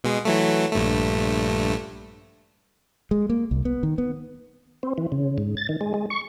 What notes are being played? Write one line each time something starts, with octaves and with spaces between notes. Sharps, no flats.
B2 G#3
E3 F#3 A3
A#1 G2 A3
G#3
A#3
C2
B3
D#3
B3
C4
E3
C#3
G#2
A6
D#3
G#3
G#3
C#6